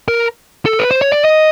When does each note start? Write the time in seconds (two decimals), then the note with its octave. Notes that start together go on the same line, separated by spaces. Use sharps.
0.08 A#4
0.65 A4
0.79 B4
0.91 C5
1.02 C#5
1.12 D5
1.24 D#5